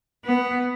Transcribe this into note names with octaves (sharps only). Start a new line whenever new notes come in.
B3